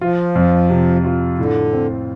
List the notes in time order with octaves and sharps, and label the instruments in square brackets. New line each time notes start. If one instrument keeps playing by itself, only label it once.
[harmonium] F3 [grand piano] F4
[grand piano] F2
C3
F4
[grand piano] A2 [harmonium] D3
[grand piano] C4